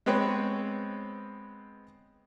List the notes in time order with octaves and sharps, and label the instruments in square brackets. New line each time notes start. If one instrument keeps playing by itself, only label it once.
[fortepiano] G#3 B3 C4 B4 C#5